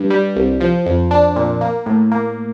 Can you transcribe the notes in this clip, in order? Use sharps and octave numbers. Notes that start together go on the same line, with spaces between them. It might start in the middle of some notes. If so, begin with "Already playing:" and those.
Already playing: G2
G3
C2
F3
F2
D4
A#2
A#3
A2
A#3